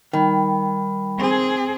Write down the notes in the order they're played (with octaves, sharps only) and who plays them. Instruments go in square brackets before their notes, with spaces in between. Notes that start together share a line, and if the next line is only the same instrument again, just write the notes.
[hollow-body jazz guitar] D#3 [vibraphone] G3 G5 B5
[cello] C4 G#4